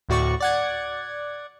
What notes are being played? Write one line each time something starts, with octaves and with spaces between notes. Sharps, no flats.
D2 A2 F#4 D5 C#6
D5 F#5 G#6